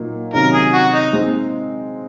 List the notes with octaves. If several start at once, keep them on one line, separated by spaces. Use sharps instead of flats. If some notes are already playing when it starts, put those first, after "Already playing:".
Already playing: A#2 F#3 A#3 D#4
C3 D#3 F#3 C#4 A#4
G#4
F#4
D#4
G#3 C4 D#4